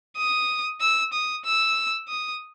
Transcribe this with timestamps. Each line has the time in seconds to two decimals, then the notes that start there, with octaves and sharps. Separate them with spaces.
0.17 D#6
0.81 E6
1.13 D#6
1.45 E6
2.09 D#6